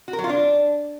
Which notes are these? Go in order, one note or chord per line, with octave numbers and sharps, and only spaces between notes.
F#4
A#4
F#3
F4
D4